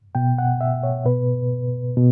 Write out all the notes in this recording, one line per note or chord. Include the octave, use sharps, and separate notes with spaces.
B2 G5
F#5
E5
C#5
B2 B4
B2